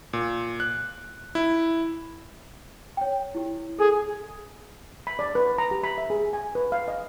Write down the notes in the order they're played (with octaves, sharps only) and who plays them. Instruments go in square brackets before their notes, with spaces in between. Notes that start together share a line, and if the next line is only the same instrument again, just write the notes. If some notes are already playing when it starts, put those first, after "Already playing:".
[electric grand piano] A#2
F#6
E4
[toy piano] C#5 G5
E4 G4
[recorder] G#4 [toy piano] A4
[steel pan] B5
D5
B4
A#5
G4
B5
E5
G#4
G#5
B4
F5
D#5